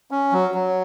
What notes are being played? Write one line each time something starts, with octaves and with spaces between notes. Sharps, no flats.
C#4
F#3
F#3